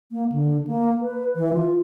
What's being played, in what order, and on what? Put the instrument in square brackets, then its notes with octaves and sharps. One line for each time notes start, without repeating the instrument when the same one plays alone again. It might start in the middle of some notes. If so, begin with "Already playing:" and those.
[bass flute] A#3
D3
A#3
B4
E3
F4